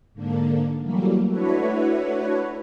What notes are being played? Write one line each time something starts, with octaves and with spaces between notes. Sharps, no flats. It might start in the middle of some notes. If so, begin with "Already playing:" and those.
G#2 D3 A#3 D4
E3 F#3 G3 A3 A#3
A3 D4 E4 F#4 B4 C#5